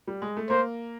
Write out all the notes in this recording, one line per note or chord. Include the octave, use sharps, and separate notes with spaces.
G3
G#3
A3
A#3 C5